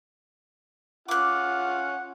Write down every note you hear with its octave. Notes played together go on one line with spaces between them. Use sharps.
C#4 F4 F#5 D6 F#6